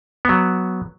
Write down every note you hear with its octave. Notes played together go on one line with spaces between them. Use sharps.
F#3 B3